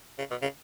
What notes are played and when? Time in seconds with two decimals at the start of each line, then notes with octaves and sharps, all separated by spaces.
0.18 C#3
0.30 B2
0.42 C#3